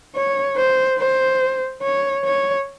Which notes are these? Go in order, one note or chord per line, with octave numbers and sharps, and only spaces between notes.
C#5
C5
C5
C#5
C#5